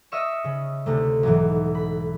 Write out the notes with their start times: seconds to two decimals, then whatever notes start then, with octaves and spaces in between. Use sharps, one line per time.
0.12 D#5 E5 C#6 E6 F6 C#7
0.44 C#3
0.86 D2 C3 A3
1.23 B1 G#2 E3
1.75 B5